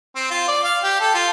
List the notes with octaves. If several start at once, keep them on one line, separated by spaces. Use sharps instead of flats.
C4
F4
D5
F5
G4
A4
F4